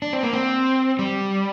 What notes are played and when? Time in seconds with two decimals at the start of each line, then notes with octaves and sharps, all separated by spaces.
0.02 D4
0.13 C4
0.23 A#3
0.33 C4
0.99 G3